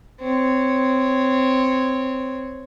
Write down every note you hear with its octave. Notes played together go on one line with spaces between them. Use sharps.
C4 C#5